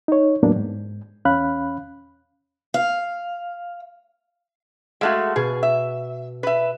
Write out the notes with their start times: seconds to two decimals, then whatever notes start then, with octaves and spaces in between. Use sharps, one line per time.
0.08 D#4 C#5
0.43 E2 A2 F#3 A#3 B3 D4
0.56 G#2
1.25 E2 C#4 F5 B5 F#6
2.74 F5
5.01 G#3 A3 F#4 E5 F5 F#6
5.36 B2 G#4
5.63 E5
6.43 B4 E5